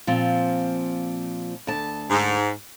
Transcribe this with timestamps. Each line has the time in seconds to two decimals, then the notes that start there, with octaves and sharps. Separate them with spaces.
0.07 A#2 F3 C4
1.67 D2 A5
2.11 G#2